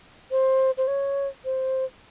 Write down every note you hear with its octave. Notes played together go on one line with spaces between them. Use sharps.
C5
C5
C#5
C5